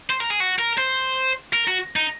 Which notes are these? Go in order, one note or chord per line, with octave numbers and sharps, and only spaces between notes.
C5
A#4
G#4
F#4
A#4
C5
A#4
F#4
D#4